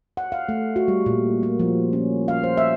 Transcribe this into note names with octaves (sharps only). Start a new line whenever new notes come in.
F#5
F5
A3
F#4
G3
A#2
A#3
F3
C#4
F5
C5
E5